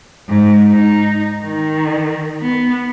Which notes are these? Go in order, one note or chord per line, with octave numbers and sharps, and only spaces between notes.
G#2
D#4
D#3
B3